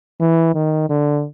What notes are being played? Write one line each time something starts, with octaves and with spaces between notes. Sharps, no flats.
E3
D#3
D3